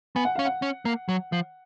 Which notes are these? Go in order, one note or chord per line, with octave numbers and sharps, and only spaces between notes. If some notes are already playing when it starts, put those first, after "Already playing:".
B3 G#5
F#5
C#4 F5
F#5
C#4
A#3
F#3
F3